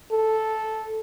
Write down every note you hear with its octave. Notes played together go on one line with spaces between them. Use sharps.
A4